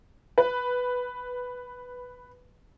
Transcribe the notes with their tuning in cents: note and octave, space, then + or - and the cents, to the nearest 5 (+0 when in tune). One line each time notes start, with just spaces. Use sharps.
B4 +0